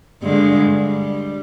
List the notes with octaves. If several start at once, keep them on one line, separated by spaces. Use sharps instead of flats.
G2 D3 G#3
G3